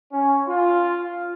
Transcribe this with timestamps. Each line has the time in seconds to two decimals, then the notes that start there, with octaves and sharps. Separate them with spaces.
0.12 C#4
0.47 F4